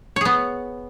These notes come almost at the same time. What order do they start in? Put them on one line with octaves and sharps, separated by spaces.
C#5 G#4 B3